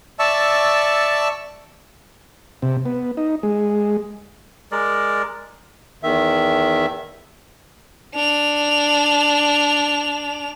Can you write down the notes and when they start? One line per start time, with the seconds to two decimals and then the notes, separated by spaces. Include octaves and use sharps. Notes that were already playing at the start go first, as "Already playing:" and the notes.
0.19 D5 E5 A5 C#6 E6
2.62 C3
2.85 B3
3.17 D#4
3.43 G#3
4.72 G#3 A#4 D5
6.03 E2 D#3 E5
8.15 D4 F7